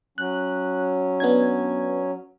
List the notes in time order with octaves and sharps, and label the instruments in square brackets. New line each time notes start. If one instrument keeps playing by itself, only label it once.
[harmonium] F#3 C#4 [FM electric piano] F#6
[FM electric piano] B3 D4 G#6